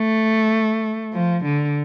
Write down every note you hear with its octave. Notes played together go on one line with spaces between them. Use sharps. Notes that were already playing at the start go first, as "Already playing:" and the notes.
Already playing: A3
F3
D3